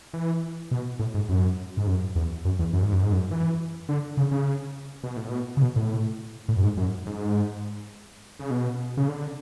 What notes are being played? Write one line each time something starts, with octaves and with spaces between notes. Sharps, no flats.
E3
B2
A2
G#2
F#2
G#2
F#2
E2
F#2
E2
F#2
G#2
F#2
G#2
F#2
E3
D3
C#3
C#3
B2
A2
B2
C#3
B2
A2
A2
F#2
G#2
F#2
G#2
C#3
B2
C#3
D3